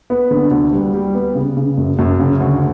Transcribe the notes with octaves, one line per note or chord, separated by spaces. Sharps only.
B3
D3
D2
G3
G3
B3
C#3
C#3
F#2
F#2
C#3
D2